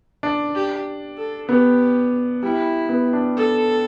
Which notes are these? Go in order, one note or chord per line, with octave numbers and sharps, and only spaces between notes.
D4
G4
A4
B3 G4
G3 E4
B3
D4
A4